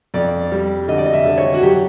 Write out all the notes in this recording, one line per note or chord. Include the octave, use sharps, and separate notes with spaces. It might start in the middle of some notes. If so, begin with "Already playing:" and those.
F2 D5
G3
D3 D#5
D5
D#5
E5
D3
C#5
F#4
F#3 G4